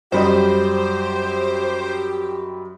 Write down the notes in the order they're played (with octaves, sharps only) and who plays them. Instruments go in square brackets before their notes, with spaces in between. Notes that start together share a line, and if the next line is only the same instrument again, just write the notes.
[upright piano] F#2 G3 D#5 [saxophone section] G4 [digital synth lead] C5